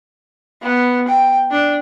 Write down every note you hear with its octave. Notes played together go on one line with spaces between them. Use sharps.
B3
G5
D4